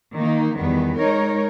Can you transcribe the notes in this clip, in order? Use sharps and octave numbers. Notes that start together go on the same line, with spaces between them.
D#3 A#3 D#4
E2 D#3 G3 B3
G#3 D#4 A#4 C#5